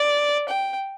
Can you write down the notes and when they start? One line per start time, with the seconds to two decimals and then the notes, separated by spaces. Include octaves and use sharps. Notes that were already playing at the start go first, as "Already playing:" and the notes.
Already playing: D5
0.49 G5